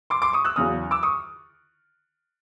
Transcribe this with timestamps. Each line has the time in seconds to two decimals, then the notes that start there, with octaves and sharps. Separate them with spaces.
0.10 C6 D6
0.22 C6 D6
0.33 C#6 D#6
0.45 E6 F#6
0.56 E2 C#3 F#3 D#6 F6
0.91 D6 E6
1.03 C#6 D#6